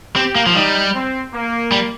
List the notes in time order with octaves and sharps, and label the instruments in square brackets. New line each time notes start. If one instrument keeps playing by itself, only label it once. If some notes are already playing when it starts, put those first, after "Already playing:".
[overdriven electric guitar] C4 [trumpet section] G4
[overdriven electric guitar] A#3
F3
[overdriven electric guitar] G3 [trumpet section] D#4
[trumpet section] C4
A#3
[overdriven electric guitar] G3